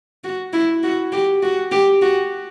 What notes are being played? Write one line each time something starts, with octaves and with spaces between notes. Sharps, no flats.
F#4
E4
F#4
G4
F#4
G4
F#4